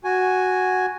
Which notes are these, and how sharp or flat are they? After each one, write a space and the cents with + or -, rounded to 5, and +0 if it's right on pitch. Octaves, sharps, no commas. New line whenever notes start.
F#4 +0 G#5 +0